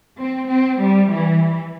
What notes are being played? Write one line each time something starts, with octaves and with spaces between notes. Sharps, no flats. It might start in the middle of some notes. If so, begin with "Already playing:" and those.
C4
C4
G3
E3